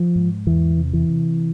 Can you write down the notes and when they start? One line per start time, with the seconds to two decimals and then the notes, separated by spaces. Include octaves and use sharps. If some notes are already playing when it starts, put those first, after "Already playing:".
Already playing: F3
0.16 G#2
0.46 E2 E3
0.78 C3
0.93 E3
1.09 C3